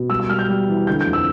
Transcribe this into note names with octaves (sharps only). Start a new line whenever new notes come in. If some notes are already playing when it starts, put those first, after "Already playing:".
Already playing: B2
G3 E6
E6
G3 F6
G6
G3
E3
D3 G6
G6
F2
E6